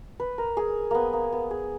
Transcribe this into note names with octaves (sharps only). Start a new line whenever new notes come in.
B4
A#4
G#4
A#3 B3
A#3
B3
G#4